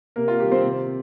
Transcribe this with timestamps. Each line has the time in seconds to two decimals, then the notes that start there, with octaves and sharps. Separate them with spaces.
0.16 C3 A#3 A#4
0.28 F4
0.40 D#3 G3 G4
0.52 C4 C5
0.64 C3